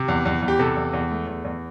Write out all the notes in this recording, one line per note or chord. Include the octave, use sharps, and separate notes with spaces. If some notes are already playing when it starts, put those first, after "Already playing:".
Already playing: C3
E2
E2
E2
G4
C3 A4
E2
E2
A3
E2
E2